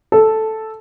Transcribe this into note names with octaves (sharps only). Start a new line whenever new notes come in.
A4